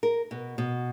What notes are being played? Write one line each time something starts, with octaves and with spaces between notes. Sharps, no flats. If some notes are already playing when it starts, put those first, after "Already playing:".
A#4
B2
B2